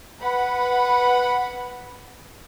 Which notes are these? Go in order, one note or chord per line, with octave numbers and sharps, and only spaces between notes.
B4 F#5 B5